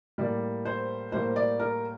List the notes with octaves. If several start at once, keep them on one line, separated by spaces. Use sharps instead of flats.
A2 G3 A#3 D5
C5
A2 G3 A#3 C5
D5
A#4